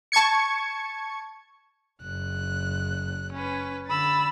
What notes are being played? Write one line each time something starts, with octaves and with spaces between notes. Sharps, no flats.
A5 C#6 G#6 C#7
F#1 F#6
C#4 B4
D3 B5 E6 A6